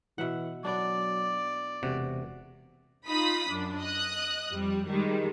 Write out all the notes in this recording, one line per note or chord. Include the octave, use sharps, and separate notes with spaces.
B2 E3 E5 F#5
F#3 B3 D4 D5
E1 C3 F#4
D#4 F4 B5 D#6 B6
F#2 D4
D#5 D#6 F#6
F2 G3
D#3 G3 G#3